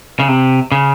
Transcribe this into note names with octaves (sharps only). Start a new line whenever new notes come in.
C#3
C3
C#3